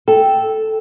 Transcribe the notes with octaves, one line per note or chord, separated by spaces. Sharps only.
A4 G5